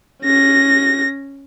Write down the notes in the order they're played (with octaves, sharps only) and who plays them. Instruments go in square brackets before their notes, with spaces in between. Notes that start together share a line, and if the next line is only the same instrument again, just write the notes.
[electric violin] C#4 A#6